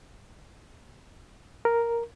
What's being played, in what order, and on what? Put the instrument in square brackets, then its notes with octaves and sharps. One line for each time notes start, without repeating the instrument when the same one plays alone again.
[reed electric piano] A#4